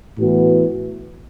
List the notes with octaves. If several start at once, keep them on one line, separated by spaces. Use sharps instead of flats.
A2 E3 B3 F#4